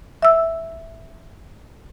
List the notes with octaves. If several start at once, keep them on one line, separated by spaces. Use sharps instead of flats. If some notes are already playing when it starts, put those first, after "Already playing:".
E5 E6